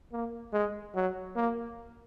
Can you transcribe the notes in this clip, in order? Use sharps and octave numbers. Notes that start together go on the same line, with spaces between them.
A#3
G#3
F#3
A#3